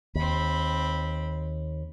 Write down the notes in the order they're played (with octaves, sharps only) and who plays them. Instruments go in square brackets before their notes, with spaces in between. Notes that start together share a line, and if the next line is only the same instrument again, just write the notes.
[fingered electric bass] D#2 [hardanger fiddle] C4 B5